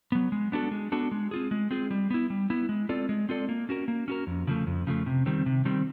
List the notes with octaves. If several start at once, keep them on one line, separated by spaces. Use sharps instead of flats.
F#3 B3
G#3
B3 D4 F#4 A4
G#3
B3 D4 F#4 A4
G#3
C4 F4 G#4
G#3
C4 F4 G#4
G3
B3 E4
G3
B3 E4
G#3
C4 F4 A4 D5
G#3
C4 F4 A4 D5
A#3
C#4 F#4 A#4
A#3
C#4 F#4 A#4
F2
C#3 F3 A3
F2
C#3 F3 A3
C3
D#3 G3 C4
C3
D#3 G3 C4